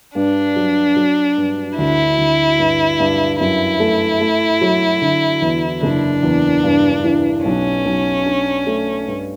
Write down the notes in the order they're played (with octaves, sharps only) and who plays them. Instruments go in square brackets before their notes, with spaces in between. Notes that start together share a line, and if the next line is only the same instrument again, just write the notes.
[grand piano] G2 [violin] D4
[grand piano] F#3
F#3
G2
[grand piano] D2 [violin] E4
[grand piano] D2
G2
G2
[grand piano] F#2 [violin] E4
[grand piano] A3
A3
F#3
D3
E2
[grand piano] F#1 [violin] D4
[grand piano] E2
G2
E3
[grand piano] B1 [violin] C#4
[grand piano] B1
D4
A3
G2